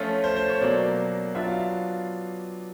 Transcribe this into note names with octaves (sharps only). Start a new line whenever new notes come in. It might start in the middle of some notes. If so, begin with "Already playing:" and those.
Already playing: F3 A3 C#4 F4
C5
C5
C#5
B2 F#3 A#3 D5
F#3 B3 D4 F4 E5
F5